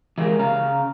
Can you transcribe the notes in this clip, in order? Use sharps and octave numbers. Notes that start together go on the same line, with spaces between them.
E3 G#3 A#3 F#4 G4 A#4
C#3 F5 A#5